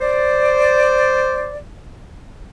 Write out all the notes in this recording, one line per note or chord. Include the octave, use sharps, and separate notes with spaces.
C5 D5